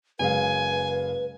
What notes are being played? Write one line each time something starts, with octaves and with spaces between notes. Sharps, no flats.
F#1 G#3 B4 F5 G#5